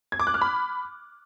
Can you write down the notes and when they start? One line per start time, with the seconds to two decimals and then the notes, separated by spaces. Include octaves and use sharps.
0.12 G#6
0.20 D6
0.27 F#6
0.34 F6
0.42 B5